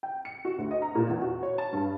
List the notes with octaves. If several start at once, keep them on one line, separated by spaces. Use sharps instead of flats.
G5
C#7
F#4
D2
D#5
A#5
A#2
E2
F#4
C#5
A5
G2